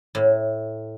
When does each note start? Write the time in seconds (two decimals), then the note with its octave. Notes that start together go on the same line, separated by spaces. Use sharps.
0.15 A2